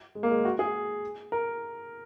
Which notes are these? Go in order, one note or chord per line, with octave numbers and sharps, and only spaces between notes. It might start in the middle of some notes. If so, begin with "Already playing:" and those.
G#3
A#3
G#3
F#4
G#4
A#4